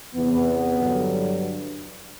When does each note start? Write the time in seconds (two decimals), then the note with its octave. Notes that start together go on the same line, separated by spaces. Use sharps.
0.14 E2 C3 E3 B3
0.78 G2 D3 F#3